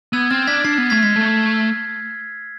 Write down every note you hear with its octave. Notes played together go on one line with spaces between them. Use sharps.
B3 E6 G#6
C4 F6 A6
D4 G#6 B6
D4 A6 C7
B3
A3 G#6 B6
G#3 G#6 B6
A3